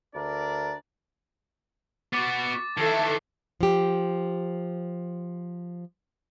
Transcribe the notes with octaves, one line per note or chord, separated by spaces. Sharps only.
D2 D4 A#4 D5
B3 F#4 D6 A6
D#3 E3 A4 E5 G#6 C7
F3 G4